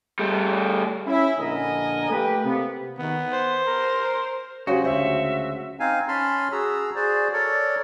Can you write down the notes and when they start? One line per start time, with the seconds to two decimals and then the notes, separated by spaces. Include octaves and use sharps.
0.19 G3 A3
1.06 C#4 E4
1.38 A#1 D3 A#4 D#5 G#5
2.11 A3 A#3 G4 B4
2.44 C3 A#3 B3
2.99 D#3 B3
3.33 C5
3.67 A#4
4.67 C#3 F#3 G#3 F#4 G4 C5
4.84 D2 F4 C5 E5
5.80 C4 D#4 F5 G#5
6.08 C#4 A5 B5 C6 F6
6.52 F#4 G#4 A#5 E6
6.95 F#4 G#4 C5 D5
7.33 A4 A#4 C#5 D5